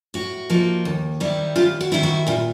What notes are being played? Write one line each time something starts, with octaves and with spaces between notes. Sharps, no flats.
A2 F#4
F3 A#3 D#4
D#2
D#3 G3 C4 E4
D#2 F4 G4
F#4
D#3 G3 C4 E4
F#4
A#2 F4